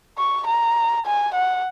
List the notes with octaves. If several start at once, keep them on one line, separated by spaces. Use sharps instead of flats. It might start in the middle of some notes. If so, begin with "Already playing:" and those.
C#6
A#5
G#5
F#5